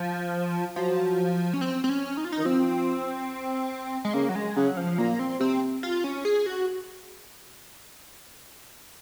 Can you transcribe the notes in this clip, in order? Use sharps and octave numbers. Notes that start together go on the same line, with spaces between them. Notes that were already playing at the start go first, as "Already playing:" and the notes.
Already playing: F3
F3 F#3
C#4
C4
C4
C#4
D#4
F4
D#4
D#3
F3 C4
G#3
C#3 A#3
F#3
G#3
C#3 F#3
F3
A#2 A#3
C4
C3 C4
F4
C#4
G#4
F#4